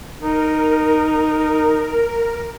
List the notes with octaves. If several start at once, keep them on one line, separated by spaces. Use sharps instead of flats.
D#4 A#4